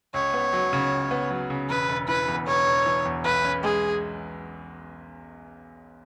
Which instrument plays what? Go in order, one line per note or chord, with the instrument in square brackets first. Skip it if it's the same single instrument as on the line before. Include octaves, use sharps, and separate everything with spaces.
[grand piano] C#2 [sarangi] C#5
[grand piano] B3
F#3
C#3
C#2
B3
F#3
C#3
[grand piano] E1 [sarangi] B4
[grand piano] E1
[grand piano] E3 [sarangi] B4
[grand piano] E2
[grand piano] E1 [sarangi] C#5
[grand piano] E1
E3
E2
[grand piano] B1 [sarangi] B4
[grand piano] C#4
[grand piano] G#3 [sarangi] G#4